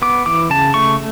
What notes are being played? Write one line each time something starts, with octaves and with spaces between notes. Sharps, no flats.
B3 D6
E3 D6
C#3 A5
A3 C#6